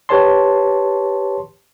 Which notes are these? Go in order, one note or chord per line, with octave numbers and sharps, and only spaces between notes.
G4 B4 C#5 A5 C6